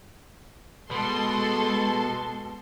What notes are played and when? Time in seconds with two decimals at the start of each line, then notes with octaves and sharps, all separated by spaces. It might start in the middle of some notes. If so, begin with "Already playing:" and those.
0.91 B2 G#3 A4 C6